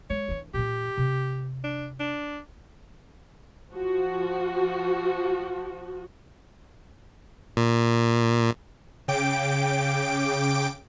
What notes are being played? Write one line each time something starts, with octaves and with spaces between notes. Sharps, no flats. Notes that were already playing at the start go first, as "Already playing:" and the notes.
G#3 C#5
E3 D4
A#2 E3 G4
C3
D4
D4
F3 F#4
A#2
C#3 G5 D6 D7